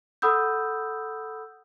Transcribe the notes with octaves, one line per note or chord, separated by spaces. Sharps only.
A4 F#5 B5 D#6 E6 G6